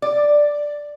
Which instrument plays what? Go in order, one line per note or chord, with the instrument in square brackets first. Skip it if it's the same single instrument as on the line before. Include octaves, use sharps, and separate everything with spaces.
[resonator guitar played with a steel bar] D5